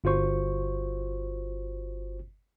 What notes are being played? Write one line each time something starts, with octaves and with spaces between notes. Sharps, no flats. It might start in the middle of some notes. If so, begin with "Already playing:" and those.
G1 F4 F#4 C5 C#6